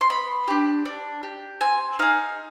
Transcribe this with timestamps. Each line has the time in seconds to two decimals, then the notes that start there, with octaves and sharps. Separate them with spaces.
0.01 C6
0.10 B3 B5
0.48 D4 G4
0.85 D4
1.23 G4
1.61 C4 G#5
1.99 D#4 G#4 F5